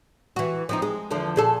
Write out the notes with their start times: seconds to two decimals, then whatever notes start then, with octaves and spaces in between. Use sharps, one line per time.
0.36 E3 F#4
0.69 F3 C4 D#4
0.82 G#3
1.10 E2 D3 F3
1.36 A#2 G#4 A4